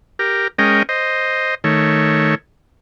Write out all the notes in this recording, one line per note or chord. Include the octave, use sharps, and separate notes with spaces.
G4 A#4
G#3 C#4 A#4 D#5 G5
C5 D#5
D#3 A3 C#5